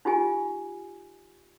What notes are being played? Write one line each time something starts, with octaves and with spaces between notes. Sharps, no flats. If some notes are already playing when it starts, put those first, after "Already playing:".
D#4 F4 G4 G#5